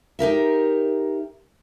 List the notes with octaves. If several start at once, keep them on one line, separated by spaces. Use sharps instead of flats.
D#4 G4 A#4 E5